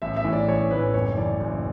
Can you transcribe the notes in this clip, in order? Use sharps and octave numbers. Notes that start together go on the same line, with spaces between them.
A1 E5
E5
A2 E3
D5
A1 C#5
A2 E3 B4
F#1 C#5
F#2 E3 D5
F#1